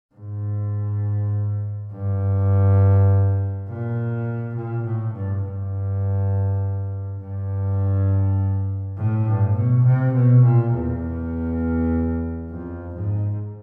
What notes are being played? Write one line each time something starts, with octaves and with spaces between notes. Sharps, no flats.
G#2
G2
A#2
A#2
A2
G2
G2
G2
A2
G2
B2
C3
B2
A#2
E2
F2
G#2